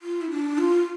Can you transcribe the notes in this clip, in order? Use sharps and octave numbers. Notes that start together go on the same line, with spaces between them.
F4
E4
D4
F4